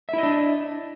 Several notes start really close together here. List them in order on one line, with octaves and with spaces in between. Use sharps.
E5 E4 D#5 D4